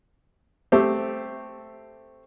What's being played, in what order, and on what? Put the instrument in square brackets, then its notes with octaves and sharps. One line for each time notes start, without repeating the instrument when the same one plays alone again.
[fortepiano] A3 C4 G4